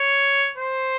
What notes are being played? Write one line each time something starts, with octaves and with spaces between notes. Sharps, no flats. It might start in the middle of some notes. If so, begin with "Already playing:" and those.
Already playing: C#5
C5